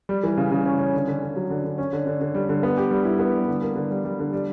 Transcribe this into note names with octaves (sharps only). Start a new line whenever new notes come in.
G3
E3
C#3
C#3
C#4
C#4
D3
D3
D3
F#3
D3
D3
C#4
D3
D3
D3
G3
D3
B3
G4
G3
E4
B3
G3
D3
A#3
D3
G3
G3
D3
G3